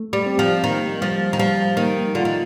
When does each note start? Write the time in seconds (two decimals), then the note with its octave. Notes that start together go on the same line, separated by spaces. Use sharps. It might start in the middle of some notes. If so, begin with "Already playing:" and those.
Already playing: A3
0.13 G3
0.26 C4
0.39 F3
0.64 D#3 A#3
1.02 F3 G3
1.33 D#3
1.39 F3 G3
1.77 D#3 A#3
2.15 D3 F4
2.25 D#3